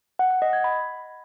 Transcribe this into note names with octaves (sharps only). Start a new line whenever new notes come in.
F#5
F#5
D#5
G#6
B5